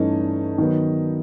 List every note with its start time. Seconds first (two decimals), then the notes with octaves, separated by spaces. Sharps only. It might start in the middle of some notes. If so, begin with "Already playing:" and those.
Already playing: G2 E3 A3 C#4 D#4
0.58 D#3 F#3 B3